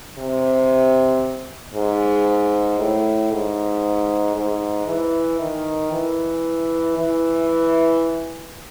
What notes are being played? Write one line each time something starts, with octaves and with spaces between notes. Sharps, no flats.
C3
G#2
A2
G#2
G#2
E3
D#3
E3
E3